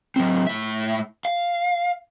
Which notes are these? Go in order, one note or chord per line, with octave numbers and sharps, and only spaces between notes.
F#3 C4
A2 E5
F5